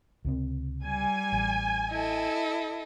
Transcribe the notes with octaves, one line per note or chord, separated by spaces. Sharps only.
C#2 C3 C4
G3 G#5
A1
E4 A4 D#5